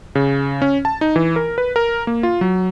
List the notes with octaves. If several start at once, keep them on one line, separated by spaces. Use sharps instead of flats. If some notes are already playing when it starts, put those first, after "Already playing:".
C#3
C#4
A5
D#4
E3
A#4
B4
A#4
A#3
F4
F#3